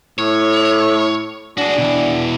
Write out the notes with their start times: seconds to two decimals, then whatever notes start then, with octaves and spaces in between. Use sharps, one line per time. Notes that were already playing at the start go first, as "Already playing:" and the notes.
0.19 A2 C#5
1.58 D4 F#4 G#4
1.78 B2 E3